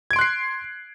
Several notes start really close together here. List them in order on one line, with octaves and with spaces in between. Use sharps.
G#6 D7 C6 F#6 C7